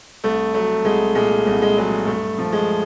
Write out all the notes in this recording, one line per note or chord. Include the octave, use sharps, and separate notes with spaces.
C2 A3
F#3 A3
C2 G#3
A#2 G#3
C2
G#3
F#3 G#3
G2 A3
F3
G#3